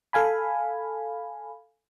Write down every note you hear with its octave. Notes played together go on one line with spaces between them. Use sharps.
A4 F5 G#5 B5